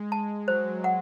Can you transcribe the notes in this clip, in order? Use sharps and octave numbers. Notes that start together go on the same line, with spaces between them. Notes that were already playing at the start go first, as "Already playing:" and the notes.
Already playing: G#3
G#3 A5
F#3 C5
F#5